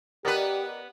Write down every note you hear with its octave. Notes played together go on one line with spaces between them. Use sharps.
B3 G4 A#4 B4 D5 D#5